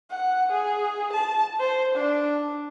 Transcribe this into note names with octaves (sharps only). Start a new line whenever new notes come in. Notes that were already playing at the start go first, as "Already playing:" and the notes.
F#5
G#4
A5
C5
D4